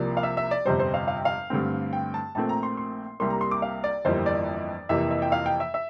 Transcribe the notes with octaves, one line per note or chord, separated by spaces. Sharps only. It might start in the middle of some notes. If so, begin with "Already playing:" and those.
Already playing: C2 C3 F3 A#3 D5
F5
E5
E5
D5
G1 F2 C3 G3 C5
C5
F5
F5
G5
F5
G2 D3 A3 C4
G5
A5
A#1 A#2 A3 C4 A5
A#5
C6
C6
C2 C3 G3 A#3 C6
A#5
C6
D6
F5
D5
G1 F2 E3 G3 A#3 C5
D5
F2 C3 E3 A#3 E5
E5
G5
F5
G5
E5
E5